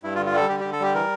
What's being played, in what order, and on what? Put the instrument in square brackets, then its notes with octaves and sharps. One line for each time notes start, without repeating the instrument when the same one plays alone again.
[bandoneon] G2 E4
F4
D3
F4
G3 A4
D3 G4
D3 G4
A4
G3 G4
E3 A#4